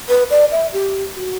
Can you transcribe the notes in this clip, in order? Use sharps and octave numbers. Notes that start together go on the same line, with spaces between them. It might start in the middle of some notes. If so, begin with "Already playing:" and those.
B4
D5
E5
G4
F#4